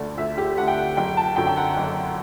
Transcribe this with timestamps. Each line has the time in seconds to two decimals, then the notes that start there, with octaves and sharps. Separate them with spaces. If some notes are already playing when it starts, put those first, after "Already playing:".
Already playing: D2 D3 A3 D5
0.18 D2 E5
0.38 G4
0.58 D3 A3 F#5
0.68 G5
0.77 F#5
0.97 F#1 G5
1.17 A5
1.36 F#2 D3 F#3 G5
1.47 G5
1.57 F#5
1.76 F#1